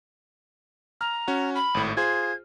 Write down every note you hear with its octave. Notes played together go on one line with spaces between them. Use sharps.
A#5 F6
C#4 F#4
B5
G#1 A2
F4 G#4 C5 G#6